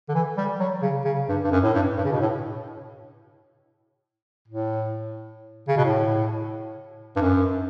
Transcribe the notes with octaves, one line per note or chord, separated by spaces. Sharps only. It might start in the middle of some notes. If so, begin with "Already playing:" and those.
D3
E3
G3
F#3
C#3
C#3
G2
G2
F#2
A2
G2
G2
C#3
B2
A2
A2
C#3
B2
A2
G2
F#2